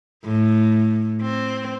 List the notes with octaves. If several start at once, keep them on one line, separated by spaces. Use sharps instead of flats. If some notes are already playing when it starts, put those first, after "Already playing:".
A2
C4